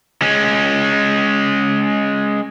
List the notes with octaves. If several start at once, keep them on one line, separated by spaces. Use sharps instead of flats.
G#3 C#4